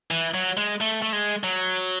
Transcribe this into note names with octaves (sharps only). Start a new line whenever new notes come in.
E3
F#3
G#3
A3
A3
G#3
F#3